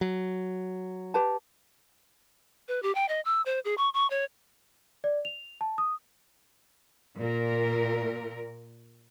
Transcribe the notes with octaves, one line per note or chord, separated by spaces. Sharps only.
F#3
G4 B4 A5
B4
G4
G5
D#5
E6
C5
G#4
C#6
C#6
C#5
D5
F7
A5
D#6
A#2 A#4